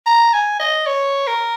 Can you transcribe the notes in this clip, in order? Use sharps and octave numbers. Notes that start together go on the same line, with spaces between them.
A#5
G#5
D#5
C#5
A#4